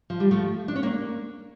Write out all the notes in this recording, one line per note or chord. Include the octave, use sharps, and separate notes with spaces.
F3
G3
F3 A3
D4
C#4
A#3 D4